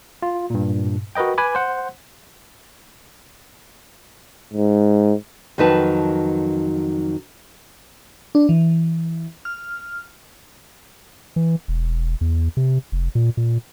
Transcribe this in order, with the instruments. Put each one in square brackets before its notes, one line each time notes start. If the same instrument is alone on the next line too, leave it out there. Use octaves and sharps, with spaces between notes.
[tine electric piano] F4
G2 A#2
F#4 A#4 B4 D#5 G5
B4 G#5 B5 D6
C5 F#5
[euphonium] G#2
[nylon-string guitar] F2 D#3 F#3 D#4 B4 A5
[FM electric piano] D4
E3
F6
[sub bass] E3
E1
E2
C3
F1
A#2
A#2